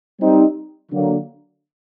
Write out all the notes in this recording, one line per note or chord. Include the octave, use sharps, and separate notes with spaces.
G3 C4 D#4
D3 F#3 A#3